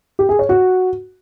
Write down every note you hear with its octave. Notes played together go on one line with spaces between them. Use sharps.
G4
G#4
C#5
F#4